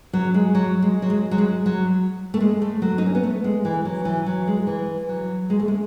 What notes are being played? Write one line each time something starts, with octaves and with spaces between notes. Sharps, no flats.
F#3
G#3
F#3
G#3
F#3
G#3
F#3
G#3
F#3
A3
G#3
A3
F#3
D#4
C#4
B3
A3
G#3
E3
F#3
E3
F#3
G#3
E3
F#3
G#3
A3
G#3